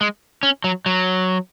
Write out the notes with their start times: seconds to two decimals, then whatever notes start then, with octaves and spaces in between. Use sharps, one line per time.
0.01 G#3
0.43 C#4
0.64 F#3
0.86 F#3